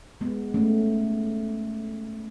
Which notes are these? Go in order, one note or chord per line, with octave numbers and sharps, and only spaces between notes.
G#3 B3
A3 C#4